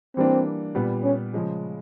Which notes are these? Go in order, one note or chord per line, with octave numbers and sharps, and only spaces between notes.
E3 G3 A#3 C4 D4
A#2 G3 B3
C#4
C#3 F3 G#3 C#4